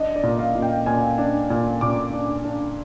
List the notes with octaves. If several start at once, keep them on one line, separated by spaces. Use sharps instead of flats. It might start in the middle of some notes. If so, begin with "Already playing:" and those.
Already playing: D4 D#5
D5
A#2
F5
A#2
G5
A#2 G#5
D4
A#2
A#2 D6
D4
D4